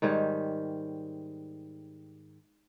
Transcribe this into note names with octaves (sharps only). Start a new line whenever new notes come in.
G#2 D#3 G3 C#5